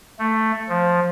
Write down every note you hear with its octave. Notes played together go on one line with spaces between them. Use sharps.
A3
F3